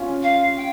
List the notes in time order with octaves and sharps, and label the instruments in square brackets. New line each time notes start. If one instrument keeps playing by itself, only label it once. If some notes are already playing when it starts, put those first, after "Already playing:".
Already playing: [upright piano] C#4 F4
[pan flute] F5
G5